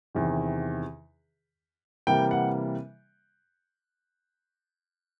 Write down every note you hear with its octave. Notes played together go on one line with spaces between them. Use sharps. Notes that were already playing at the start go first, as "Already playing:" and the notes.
E2 C3 D#3
C3 E3 G3 A#3 G5
F#5